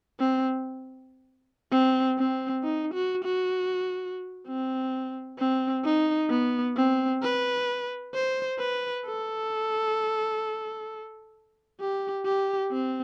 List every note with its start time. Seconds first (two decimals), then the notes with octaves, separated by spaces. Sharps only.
0.20 C4
1.72 C4
2.18 C4
2.64 D#4
2.94 F#4
3.24 F#4
4.47 C4
5.39 C4
5.85 D#4
6.30 B3
6.77 C4
7.23 B4
8.14 C5
8.59 B4
9.06 A4
11.80 G4
12.26 G4
12.72 C4